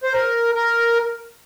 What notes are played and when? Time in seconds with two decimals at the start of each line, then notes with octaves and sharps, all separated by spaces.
0.03 C5
0.13 A#4
0.55 A#4